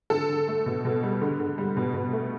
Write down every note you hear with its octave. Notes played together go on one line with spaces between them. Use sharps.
D3 A4
D3
A3
B2
B2
G3
D3
D3
G3
B2
B2
A3